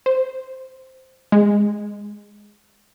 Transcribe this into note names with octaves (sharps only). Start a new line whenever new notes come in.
C5
G#3